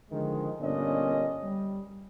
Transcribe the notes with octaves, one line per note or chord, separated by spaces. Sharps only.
D3 D#3 F3 G#3
G1 A#2 C#4 D4 D#5
G3